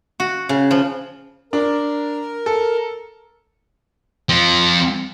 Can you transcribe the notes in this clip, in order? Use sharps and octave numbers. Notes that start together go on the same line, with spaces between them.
F#4
C#3
F3
D4 A#4
A4
F3 C4